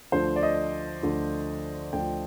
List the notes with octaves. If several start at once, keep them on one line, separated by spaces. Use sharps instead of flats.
D2 D3 F3 C5
D5
D#5
D2 D3 F3
D2 D3 F3 G5